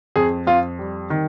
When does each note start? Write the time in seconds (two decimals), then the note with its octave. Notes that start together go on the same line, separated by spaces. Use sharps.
0.16 F2 G#4
0.47 F2 F4
0.79 G3
1.10 D#3